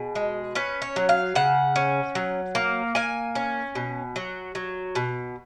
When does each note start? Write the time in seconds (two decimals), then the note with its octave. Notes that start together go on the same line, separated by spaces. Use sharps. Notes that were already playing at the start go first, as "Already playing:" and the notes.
Already playing: B2 G#4
0.15 G#3
0.55 C#4 B4
0.82 C#5
0.96 F#3
1.09 F5
1.35 C#3 F#5
1.76 C#4
2.15 F#3
2.55 A#3
2.95 A#3 G#5
3.35 C#4
3.75 B2
4.16 F#3
4.55 F#3
4.95 B2